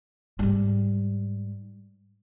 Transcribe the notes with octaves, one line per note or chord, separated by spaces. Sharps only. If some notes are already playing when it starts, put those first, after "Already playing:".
G#2 G3